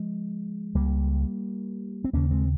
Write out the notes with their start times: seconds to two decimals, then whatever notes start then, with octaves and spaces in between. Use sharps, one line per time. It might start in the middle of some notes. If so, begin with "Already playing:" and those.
Already playing: F3 G#3
0.74 C#2 C#3 G3 A#3
2.04 C4
2.13 D#2 C#3 A#3 C#4
2.31 G#3 C4